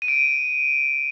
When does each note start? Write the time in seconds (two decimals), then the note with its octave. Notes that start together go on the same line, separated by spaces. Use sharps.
0.02 D#7
0.08 D7